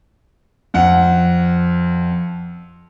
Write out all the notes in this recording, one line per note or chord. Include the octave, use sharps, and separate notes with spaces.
F2 F#5